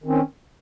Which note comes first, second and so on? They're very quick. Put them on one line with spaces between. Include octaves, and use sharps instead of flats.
D#3 C4 C#4